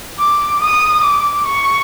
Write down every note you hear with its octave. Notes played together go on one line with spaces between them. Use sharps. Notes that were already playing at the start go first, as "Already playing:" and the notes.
D6
D#6
D6
C#6